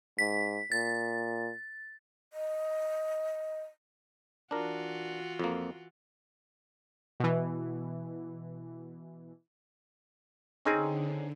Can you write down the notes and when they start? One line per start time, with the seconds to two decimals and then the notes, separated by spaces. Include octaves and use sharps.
0.19 G#2 B6
0.72 A#2 A6
2.33 D#5
4.51 E3 D4 F4 F#4 A#4
5.39 F2 A#3
7.20 B2 E3
10.65 D3 C4 C#4 D#4 G#4 A#5 D#7